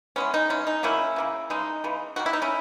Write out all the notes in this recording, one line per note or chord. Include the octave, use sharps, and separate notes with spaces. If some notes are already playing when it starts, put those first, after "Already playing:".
E3 G#3 B3 C#4
D#4
E3 G#3 B3 C#4
D#4
C#3 F#3 A#3 C#4 E4
C#3 F#3 A#3
C#3 E3 G#3 D#4
C#3 E3 G#3
D#3 A#3 F#4
E4
D#4
C#4 E4